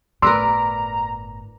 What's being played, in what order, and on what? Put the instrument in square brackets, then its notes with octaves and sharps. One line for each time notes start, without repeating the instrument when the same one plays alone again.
[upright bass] G1 A2 [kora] A#4 B4 D5 [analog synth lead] A#5 [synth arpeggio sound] C6 E6